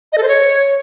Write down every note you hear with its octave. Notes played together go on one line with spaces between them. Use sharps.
D#5
A4
C5
C#5